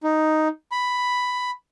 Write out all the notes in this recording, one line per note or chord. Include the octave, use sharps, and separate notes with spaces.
D#4
B5